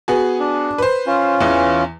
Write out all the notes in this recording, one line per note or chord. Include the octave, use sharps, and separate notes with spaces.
B3 F#4 G#4
D4
B4 C5
C#4 F4
E2 E3